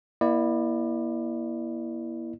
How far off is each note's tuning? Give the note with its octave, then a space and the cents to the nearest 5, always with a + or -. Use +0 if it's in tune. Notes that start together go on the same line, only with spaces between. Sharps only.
A#3 +40 E4 +0 D5 +30